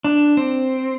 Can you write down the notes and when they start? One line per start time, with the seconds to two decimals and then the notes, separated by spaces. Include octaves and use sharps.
0.04 D4
0.37 C4